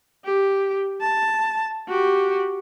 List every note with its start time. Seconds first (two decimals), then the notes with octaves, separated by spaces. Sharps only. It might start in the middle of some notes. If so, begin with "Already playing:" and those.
0.25 G4
1.00 A5
1.88 F#4 G4